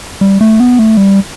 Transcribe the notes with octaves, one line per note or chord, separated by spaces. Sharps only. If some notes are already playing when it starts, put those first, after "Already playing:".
G3
A3
B3
A3
G3